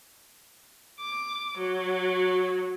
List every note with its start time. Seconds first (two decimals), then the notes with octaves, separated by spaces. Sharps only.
1.00 D6
1.58 F#3